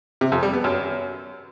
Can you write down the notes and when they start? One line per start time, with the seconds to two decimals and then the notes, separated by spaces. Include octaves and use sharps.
0.21 C3
0.32 F2
0.43 G3
0.53 B3
0.64 F#2